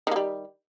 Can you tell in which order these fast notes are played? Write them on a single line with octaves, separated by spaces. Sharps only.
D#3 A#3 G3